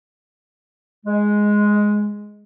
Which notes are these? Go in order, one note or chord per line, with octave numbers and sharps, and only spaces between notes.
G#3